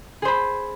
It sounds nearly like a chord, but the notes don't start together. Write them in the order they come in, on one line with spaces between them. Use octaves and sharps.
G#4 C5 B5